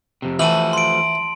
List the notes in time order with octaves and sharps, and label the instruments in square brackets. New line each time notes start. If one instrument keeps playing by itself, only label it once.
[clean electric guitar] F2 C3
[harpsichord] E3 [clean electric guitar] F3 A3 F#4 [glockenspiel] A5 D#7 F#7
[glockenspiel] C6 D7